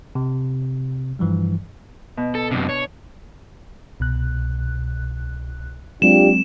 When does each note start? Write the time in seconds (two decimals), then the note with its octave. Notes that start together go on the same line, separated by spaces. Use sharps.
0.15 C3
1.19 G2 E3 F3 G3
2.17 B2
2.35 A4
2.51 F#2 C3 D4
2.69 C#5
4.00 C2 B2 F#6
6.02 F#3 G#3 C4 D4 F4 G4 E7